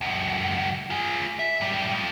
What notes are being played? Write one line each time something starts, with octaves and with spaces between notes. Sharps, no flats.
C#2 F#2
F4 G#4
E5
A2 G3
F2